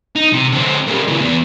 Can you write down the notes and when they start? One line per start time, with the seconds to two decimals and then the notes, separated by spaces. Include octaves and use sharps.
0.16 D#4
0.33 C3
0.53 D3 C4
0.87 G3 A#3
1.08 C#3 E3
1.20 E2